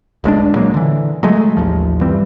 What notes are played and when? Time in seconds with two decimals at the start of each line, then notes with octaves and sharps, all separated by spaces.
0.24 D1 B1 G#3 D4
0.55 A#2 F#3 G#3 A#3
0.74 D3 E3
1.23 F#3 G#3 A3
1.57 A1 D#2 F3
2.01 G2 E3 G3 C4